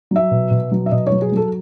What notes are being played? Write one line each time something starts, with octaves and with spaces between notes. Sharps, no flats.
F#3 E5
B2
B2
F#3
E5
B2 D#5
C#5
F#3
G#4
F#3 A4